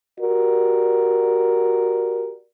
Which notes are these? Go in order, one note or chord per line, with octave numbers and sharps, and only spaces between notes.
F#4 G4 A#4 D5